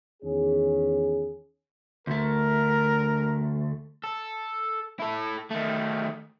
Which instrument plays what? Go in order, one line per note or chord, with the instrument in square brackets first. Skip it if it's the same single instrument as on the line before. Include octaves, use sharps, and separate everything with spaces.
[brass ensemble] E2 D#3 C#4 G#4
[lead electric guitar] D2 A3 [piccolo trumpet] A#4
[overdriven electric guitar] A4
E4 A4
D#3 A3